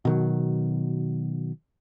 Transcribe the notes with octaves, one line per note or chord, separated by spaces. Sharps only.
B2 D#3 F#3